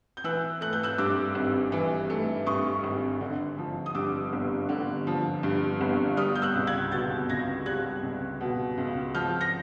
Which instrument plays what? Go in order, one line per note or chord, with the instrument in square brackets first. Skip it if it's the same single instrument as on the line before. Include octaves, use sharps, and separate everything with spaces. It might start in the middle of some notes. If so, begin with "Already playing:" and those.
[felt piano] G6
E3 E6 F#6
A3 F#6
G6
E6 F#6
G2 D6 E6
G#1
E3
A3
G2 C#6 D#6
G#1
D3
F3
D#6
G2 D6 E6
G1
D3
F3
G2
G1
G3 D#6 F6
G6
E6 F#6
C#2
F#6 G#6
B2 G6 A6
C#2 G#6 A#6
G3 F#6 G#6
C#2
B2
C#2
F3 F6 G6
A#6